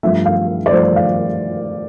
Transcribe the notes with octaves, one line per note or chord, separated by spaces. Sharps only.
G2 F3 A3 E5
F5
D5
G2 F3 A3 C5
F5